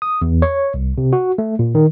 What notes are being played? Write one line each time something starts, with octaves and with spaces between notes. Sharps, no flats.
D#6
E2
C#5
C2
C3
F#4
A3
A#2
D#3